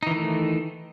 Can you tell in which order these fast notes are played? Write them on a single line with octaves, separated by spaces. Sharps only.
D#4 E3 D#3 A3